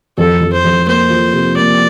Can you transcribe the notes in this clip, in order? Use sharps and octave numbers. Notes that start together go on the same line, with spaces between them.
F2 A4
F2
C5
F2
A#3 C5
F3
C3
A#3 D5